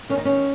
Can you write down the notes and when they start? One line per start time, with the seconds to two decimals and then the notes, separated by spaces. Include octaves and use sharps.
0.09 D#3 C#4
0.18 D#4
0.25 C#4